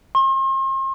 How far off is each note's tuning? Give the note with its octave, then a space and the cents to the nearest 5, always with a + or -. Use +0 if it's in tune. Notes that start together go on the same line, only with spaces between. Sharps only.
C6 +40